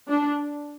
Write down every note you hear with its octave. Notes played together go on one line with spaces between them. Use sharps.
D4